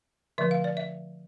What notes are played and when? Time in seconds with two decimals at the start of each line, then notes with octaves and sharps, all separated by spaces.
0.38 D3 F3 A3 E5
0.51 F5
0.64 D5
0.77 E5